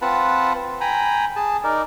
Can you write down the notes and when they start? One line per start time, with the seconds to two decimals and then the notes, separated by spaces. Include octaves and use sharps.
0.02 C4 F4 B4 F#5 A5
0.81 G5 G#5 A#5 B5
1.36 G#4 A5
1.64 D#4 A#4 D5